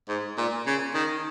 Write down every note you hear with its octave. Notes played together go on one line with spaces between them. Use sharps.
G#2
A#2
C#3
D#3